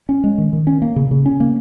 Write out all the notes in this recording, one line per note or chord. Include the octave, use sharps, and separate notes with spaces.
C#4
G#3
D#3
D#3
C#4
A#3
C#3
C#3
C#4
A#3